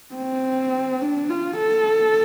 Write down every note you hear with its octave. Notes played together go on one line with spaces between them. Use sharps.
C4
D4
F4
A4